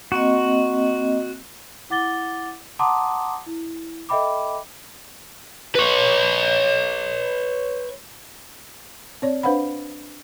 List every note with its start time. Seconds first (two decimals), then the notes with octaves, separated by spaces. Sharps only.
0.12 A#3 C4 F#4 D#5
1.90 E4 F#5 D6 A6 G7
2.79 F#5 A5 A#5 C6 D6 D#6
3.46 E4
4.09 A4 D#5 E5 G5 B5 D6
5.75 B4 C#5
9.22 C4 C#5 D5
9.43 D4 B4 C5 F5 F#5 B5